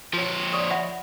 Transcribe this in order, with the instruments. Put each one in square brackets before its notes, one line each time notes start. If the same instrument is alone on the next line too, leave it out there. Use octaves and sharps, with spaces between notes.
[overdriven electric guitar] F3 C#5
[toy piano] D5 C#6 D#6
E5 F#5 B5